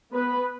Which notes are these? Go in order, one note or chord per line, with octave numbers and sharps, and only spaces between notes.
B3 B4